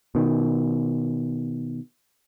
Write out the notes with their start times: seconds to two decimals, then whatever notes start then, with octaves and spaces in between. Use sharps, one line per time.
0.15 B2 D#3